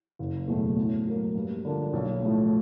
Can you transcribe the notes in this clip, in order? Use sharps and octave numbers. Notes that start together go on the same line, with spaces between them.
F#1
E2 B2 F#3 A3
A2
F#3 A#3
G2
D3 F3 A#3 D4
B1
A2 F3 A3